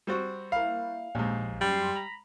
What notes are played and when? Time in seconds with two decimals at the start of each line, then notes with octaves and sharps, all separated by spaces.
0.07 G3 C4 F#4
0.52 A#3 E4 F5
1.15 A#1 D#2 G#2
1.61 F#2 G3 C6
1.95 A#5 B5